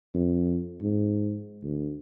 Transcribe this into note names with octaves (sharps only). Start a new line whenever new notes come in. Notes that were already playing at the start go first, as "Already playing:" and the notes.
F2
G#2
D2